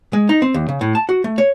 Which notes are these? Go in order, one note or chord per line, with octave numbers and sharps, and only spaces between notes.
G#3
D#4
C4
D#2
C#3
A2
A5
F#4
A3
C#5